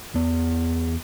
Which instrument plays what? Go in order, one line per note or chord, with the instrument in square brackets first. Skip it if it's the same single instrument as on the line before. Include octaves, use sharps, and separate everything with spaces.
[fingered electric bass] E2 B3